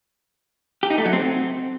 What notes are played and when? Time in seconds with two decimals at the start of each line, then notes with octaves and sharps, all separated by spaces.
0.83 G4
0.90 D#4
0.98 A3
1.05 F#3
1.13 C4